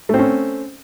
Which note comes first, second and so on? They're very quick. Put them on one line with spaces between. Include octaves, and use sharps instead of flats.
A3 C4 C#4